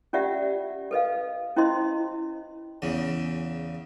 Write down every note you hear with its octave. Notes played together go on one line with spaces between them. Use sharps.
C#4 F4 G4 D5 E5 F#5
A4 B4 D#5 F5
C#4 E4 F4 C5 D#5 C6
E2 C#3